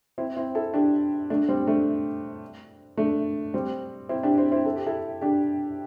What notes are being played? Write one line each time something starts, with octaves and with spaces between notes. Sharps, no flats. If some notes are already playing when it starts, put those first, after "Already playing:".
C4 E4
C4 E4
E4 A4
D4 G4
A3 D4
G3 C4
A3 D4
A3 D4
G3 C4
C4 E4
D4 G4
C4 E4
C4 E4
A4
G4
E4 A4
D4 G4